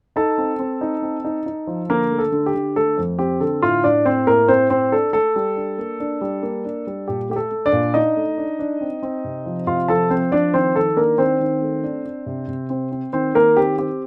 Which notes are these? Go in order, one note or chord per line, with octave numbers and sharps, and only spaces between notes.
D#4 A4 A5
C4
C4
D#4
C4
D#4
D#4
F3
D3 A#3 A#4
A3
A4
D3
G4
D3
A3 A4
F2
C4 G4
D3 A4
A2 F4 F5
A2 D4 D5
A2 C4 C5
A2 A#3 A#4
A2 C4 C5
A2 C4 C5
D4 A4
A3 A4
G3
D4
A#3
D4
G3
A#3
D4
G3
A#2 G4
A3 G4
A4
A3
D4 D5
A#2
D4 D#4 D#5
A3
D4
D4
C4
C4
C3
F3
C3 F4 F5
F3 A4 A5
F3 C4 C5
F3 D4 D5
D#3 C4 C5
D#3 A4
A#3 D4 A#4
D#3 C4 C5
D#3
A3
D4
D4
C3
C3
C4
C4
D#3 C4 C5
D#3 A#3 A#4
C4 G4
C4 G4